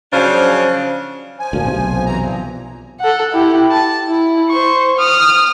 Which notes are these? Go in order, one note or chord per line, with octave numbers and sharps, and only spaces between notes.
C#3 F3 F#3 D4 C5 F5
F3 G#5
D2 A#2
B1 C3
F2 E3 A#5
A#2 F3
A4 F#5
E4 G4
A5
E4
C5 C#6
D#6 F6